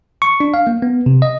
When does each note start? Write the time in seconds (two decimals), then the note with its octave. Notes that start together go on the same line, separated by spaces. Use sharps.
0.22 C#6
0.40 D4
0.54 F5
0.67 A#3
0.82 B3
1.06 C3
1.22 D#5